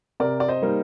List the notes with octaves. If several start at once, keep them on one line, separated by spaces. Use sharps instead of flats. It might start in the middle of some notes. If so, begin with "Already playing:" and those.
C3 A#4 D5
D5
C5 D#5
G3 A#3 D#4